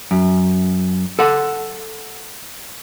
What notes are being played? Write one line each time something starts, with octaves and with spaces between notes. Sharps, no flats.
F#2
A4 F#5